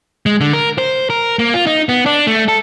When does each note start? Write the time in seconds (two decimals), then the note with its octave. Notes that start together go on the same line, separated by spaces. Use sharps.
0.26 G#3
0.41 D3
0.53 A#4
0.78 C5
1.10 A#4
1.39 A#3
1.54 F4
1.67 D#4
1.89 B3
2.06 D4
2.27 A3
2.48 A4